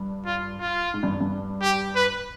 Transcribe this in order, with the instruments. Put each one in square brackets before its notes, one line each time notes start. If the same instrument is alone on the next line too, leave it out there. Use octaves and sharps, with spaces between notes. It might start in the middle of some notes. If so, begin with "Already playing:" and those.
Already playing: [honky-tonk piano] G2
[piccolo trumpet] F4
F4
[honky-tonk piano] G#2
G2
G2
[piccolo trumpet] G4
B4